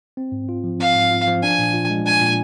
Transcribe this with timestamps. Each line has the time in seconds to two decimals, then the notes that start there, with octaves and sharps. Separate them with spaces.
0.17 C4
0.32 G#2
0.49 F4
0.64 F3
0.80 C4 F5
0.95 G#2
1.11 F4
1.27 F3
1.42 D4 G#5
1.58 A#2
1.73 F4
1.90 G#3
2.05 D4 G#5
2.21 A#2